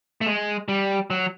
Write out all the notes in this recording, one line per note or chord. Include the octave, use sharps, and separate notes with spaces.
A3
G#3
G3
F#3